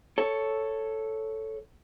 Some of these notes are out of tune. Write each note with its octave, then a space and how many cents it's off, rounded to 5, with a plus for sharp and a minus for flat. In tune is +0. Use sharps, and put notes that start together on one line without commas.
A4 +0 C#5 +0